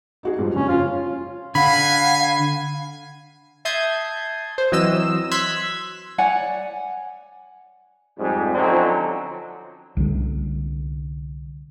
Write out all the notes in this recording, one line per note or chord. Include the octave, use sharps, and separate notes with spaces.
D#4 F#4 G#4
G2 F3
F#1 C#4
C#4 F4
D3 F5 F#5 G#5 B5
E5 A5 C6 D#6 G6 G#6
C5
E3 F#3 C4 D#5 E6 E7
C6 E6 F#6 G#6 B6
C#5 D5 F#5 G#5
F2 G#2 G3
D3 F3 F#3 C4 C#4 D#4
C2 D3